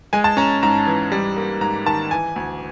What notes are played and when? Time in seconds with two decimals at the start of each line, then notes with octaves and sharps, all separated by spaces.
0.13 G#3 G#5
0.24 A5
0.37 C#4 A#5
0.62 G#2 A#5
0.86 E3
1.12 G3
1.36 A#3
1.61 G#2 A#5
1.86 D#3 A5
2.11 E3 G#5
2.36 D2